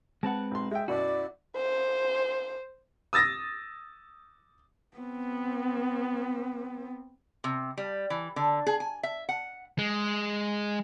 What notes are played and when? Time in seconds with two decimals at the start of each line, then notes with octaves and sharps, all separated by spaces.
0.23 G#3 C4 B4 F#5 A5
0.51 B1 C6
0.71 G#3 E5 G5
0.88 F#2 B2 E4 F#4 D5
1.56 C5
3.13 D#6 E6 A6 A#6
4.97 B3 C4
7.44 C3
7.77 G3
8.10 E3
8.36 D3
8.67 G#4
8.80 G#5
9.03 E5
9.29 F#5
9.78 G#3